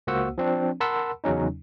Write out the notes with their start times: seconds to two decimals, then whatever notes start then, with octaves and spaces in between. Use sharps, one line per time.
0.07 C#2 A#3 F#4 C5 F#5 E6
0.38 F3 C4 D4
0.81 A#4 F#5 A5 B5 C6 E6
1.24 E2 C#3 F#3 C#4 D#4